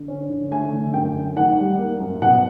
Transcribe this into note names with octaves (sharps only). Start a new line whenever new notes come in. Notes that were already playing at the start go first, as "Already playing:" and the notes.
Already playing: D3
C#4
D3
A3 G#5
D3
F#2 G5
A3
D#3 F#5
G3
A#3
F#2
B2 F#5